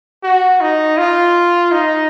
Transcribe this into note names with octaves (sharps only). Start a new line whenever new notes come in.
F#4
D#4
F4
D#4